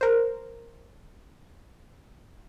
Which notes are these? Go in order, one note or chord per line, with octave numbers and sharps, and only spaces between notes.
A#4 C5